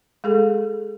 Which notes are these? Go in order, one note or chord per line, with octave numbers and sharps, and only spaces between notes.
G#3 G#4 A4